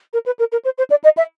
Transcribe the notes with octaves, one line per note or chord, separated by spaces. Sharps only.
A#4
B4
A#4
A#4
C5
C5
D5
D#5
E5